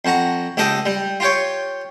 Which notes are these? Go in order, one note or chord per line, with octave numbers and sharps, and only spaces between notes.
F2 F#4 A#5
C#2 G4 A4 D#5
G3
F4 G4 C#5